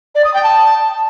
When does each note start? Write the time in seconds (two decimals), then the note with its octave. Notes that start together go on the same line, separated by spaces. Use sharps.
0.15 D5
0.24 D#6
0.34 G5
0.43 A5